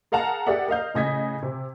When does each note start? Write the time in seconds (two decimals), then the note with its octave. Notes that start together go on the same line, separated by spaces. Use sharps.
0.12 G#4 A#4 F5 F#5 A5 A#5
0.47 G4 G#4 A#4 D5 E5 F#5
0.68 A#4 D#5 F5 G6
0.94 A2 C#3 D#5 G#6 B6
1.42 C3